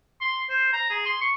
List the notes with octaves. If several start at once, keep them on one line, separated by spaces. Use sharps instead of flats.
C6
C5
A#5
G#4
C6
C#6